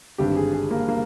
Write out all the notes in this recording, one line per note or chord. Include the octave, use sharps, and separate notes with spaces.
G#1 G2 D3 G4
G#4
G#4
A#3
A#3